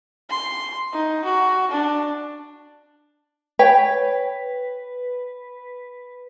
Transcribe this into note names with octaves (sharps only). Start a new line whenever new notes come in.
C6
D#4
F#4
D4
B4 C#5 G5